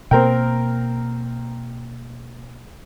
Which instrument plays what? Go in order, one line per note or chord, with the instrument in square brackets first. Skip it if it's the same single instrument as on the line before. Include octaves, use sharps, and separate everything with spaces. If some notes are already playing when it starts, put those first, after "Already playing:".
[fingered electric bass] B2 A#3 [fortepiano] C4 A#4 G5